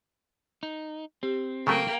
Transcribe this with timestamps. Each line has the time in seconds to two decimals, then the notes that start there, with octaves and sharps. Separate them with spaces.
0.63 D#4
1.23 C4 G4
1.67 C#3 F#3 A3 A#3 G5